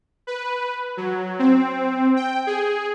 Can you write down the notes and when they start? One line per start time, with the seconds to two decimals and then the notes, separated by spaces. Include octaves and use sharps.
0.27 B4
0.97 F#3
1.39 C4
2.16 G5
2.47 G#4